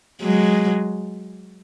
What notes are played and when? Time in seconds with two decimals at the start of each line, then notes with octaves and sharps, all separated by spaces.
0.22 F#3 G#3